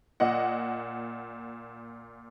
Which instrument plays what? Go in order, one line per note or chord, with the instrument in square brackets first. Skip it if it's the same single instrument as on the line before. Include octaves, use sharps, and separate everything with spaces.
[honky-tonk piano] A#2 D#5 F#5